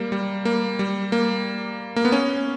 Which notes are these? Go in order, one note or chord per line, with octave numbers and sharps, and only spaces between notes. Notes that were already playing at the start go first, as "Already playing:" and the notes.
Already playing: G3 A#3
G3
A#3
G3
A#3
A#3
B3
C#4